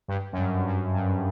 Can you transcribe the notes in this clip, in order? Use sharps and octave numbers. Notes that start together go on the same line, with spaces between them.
G2
F#2
G2
F#2
G2